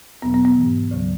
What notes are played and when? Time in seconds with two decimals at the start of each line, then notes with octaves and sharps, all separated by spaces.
0.22 E2 B2 F#3 B3
0.34 B3
0.45 B3
0.57 G#2 E3
0.91 D2 C#3 F#3